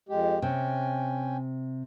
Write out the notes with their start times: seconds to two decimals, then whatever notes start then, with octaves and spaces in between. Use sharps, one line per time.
0.09 F2 G#3 G4
0.42 C3 C#4 G5 G#5